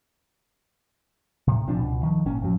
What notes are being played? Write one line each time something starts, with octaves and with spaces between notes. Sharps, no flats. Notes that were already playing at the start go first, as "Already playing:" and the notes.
A2 C3
A#1 C3 F3 D4
C#2 B2
D#3 F3
G#1 A#2 C#4
F2 A2 F3 F#3